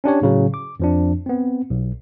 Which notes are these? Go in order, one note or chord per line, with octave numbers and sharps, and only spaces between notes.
C#4 D4 G4 C#5
A2 C#3 F#3
D6
F2 F3 D4
B3 C4
B1